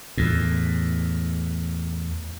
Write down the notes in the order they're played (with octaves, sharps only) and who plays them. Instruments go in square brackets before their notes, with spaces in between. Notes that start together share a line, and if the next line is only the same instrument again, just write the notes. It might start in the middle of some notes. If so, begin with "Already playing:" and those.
[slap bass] E2 A2